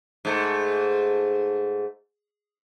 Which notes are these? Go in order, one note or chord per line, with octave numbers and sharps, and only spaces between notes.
G#2 A3